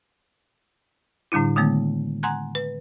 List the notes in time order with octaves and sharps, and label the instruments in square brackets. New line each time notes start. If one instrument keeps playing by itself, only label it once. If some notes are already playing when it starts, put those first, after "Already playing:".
[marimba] A2 D3 G3 D4 E4
D3 D#3 G#3 A3 B3
F#5 G#5 A#5 C6 F#6 G#6
B4